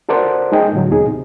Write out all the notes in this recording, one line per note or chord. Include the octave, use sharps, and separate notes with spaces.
F#4 A4 A#4 C5 D5 F#5
G#3 D#4 G#4 A4 D#5 G5
A2 D3 F#3
D#2 B2 D#4 G#4
C3